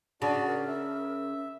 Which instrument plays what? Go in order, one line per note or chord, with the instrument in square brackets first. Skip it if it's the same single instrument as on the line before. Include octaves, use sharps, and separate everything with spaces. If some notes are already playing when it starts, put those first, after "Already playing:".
[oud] C#3 [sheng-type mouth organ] D4 F#4 D5 [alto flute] A5
[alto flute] A#4
[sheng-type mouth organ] E5